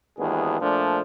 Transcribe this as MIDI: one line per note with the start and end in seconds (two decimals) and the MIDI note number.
0.19 0.60 32
0.19 0.60 39
0.19 0.60 52
0.19 0.60 59
0.19 0.60 62
0.19 0.60 68
0.61 1.01 46
0.61 1.01 53
0.61 1.01 57
0.61 1.01 62